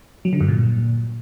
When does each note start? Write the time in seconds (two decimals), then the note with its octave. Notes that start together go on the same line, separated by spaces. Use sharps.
0.25 F#3
0.33 D3
0.41 G2
0.48 A#2